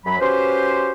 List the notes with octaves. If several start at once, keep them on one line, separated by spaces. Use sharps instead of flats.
F#2 F#3 B5
C#4 F#4 G4 B4 C5